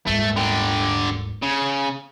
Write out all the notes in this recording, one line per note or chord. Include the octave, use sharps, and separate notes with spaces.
D#1 G#2 A3
D3 G4
C#3